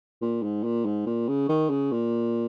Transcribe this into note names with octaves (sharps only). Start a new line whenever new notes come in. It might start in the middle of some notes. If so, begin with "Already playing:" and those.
A#2
G#2
A#2
G#2
A#2
C#3
D#3
C#3
A#2